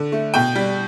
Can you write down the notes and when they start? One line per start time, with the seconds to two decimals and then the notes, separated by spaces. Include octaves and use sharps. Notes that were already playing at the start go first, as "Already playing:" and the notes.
Already playing: D3
0.12 A3
0.34 B2 G5
0.55 G3